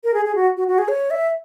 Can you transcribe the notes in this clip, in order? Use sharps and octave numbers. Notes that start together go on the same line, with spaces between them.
A#4
G#4
G#4
F#4
F#4
F#4
G#4
C#5
E5